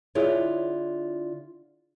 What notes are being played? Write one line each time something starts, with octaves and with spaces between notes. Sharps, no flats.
D3 E4 F4 G#4 C#5